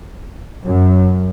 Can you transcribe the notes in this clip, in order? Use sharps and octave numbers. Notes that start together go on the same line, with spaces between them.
F#2